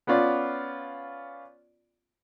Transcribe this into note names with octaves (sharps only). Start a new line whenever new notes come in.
B3 C#4 F4 D5